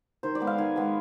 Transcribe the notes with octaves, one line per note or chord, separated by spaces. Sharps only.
D#3 C5
D5
G#3 B3
F5
D#3 G#5
G#3 B3